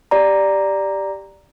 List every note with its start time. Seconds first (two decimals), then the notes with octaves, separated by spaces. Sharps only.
0.11 G4 D5 A#5